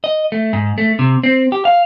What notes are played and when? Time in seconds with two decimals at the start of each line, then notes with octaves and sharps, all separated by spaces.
0.04 D#5
0.32 A3
0.53 G#2
0.78 A3
0.99 C3
1.23 C4
1.52 G4
1.65 F5